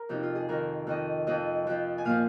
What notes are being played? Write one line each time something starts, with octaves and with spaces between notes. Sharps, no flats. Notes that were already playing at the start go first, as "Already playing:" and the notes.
Already playing: A#4
F2 C3 F3 D#4
F4
G#4
F2 D#3 A#4
F2 D#3 D#5
F2 F3 D#5
F2 F3
G#5
A#2 F3 F5